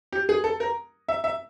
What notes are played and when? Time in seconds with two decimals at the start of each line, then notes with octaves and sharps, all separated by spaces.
0.13 G4
0.29 G#4
0.44 A4
0.60 A#4
1.08 E5
1.24 E5